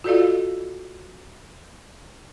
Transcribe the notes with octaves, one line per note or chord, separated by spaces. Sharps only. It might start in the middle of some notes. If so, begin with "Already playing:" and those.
F4 F#4 A4 D5 D#5 F5